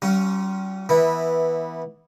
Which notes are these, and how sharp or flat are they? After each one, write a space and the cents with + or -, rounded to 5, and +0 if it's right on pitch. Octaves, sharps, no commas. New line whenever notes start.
G3 -40 C#4 +0 F4 +5
E3 -10 B3 -15 E4 -25